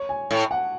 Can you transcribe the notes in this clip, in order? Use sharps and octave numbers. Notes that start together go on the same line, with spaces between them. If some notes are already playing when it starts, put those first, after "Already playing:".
Already playing: C#5
G#5
A2
F#5